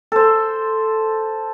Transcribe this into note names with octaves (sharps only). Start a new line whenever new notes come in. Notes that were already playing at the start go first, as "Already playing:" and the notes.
A4 C5